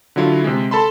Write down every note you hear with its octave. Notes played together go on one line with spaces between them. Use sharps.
D3 F#3 E4 F4
C3 G#3
A4 A5 B5 C6